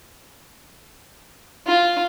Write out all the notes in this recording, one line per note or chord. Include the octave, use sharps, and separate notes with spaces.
F4